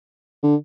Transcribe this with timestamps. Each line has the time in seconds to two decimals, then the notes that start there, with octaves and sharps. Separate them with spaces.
0.43 D3